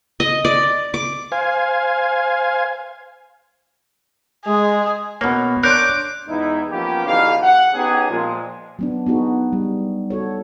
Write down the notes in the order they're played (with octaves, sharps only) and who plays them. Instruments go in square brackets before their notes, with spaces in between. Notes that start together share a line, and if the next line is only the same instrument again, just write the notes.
[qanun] D#5
D5
D6
[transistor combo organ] C5 F5 G#5
[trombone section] G#3 [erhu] G#4
[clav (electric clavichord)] B2 A#3 [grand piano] B3 C#5
[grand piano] D4 C#5 C6 [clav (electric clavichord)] A#4 [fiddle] D6 [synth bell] F#6 G6
[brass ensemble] E2 G#2 D#4 E4
F3 A#3 B3 C#4 G4
B1 D3 E3 D#4 G4 F5
F#5
B3 C#4 D#4 G4 G#4
A#2 F3 G#3
[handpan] F#3 B3 D4
B3 D#4 F#4 G#4
G3
F#4 A4 C#5